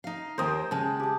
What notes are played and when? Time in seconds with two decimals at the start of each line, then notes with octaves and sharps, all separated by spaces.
0.04 D#4 F5
0.38 D#2 A#4 C5 D#5 G5
0.71 C#3 G#3 A5
1.00 G4 A5